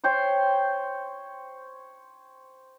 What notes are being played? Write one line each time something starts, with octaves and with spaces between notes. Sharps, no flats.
C5 C#5 G5 C6